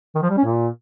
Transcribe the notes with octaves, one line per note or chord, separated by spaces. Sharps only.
D#3
F3
G3
C#4
A#2